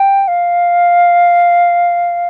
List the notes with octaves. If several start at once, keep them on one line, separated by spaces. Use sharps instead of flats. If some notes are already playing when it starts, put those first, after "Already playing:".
Already playing: G5
F5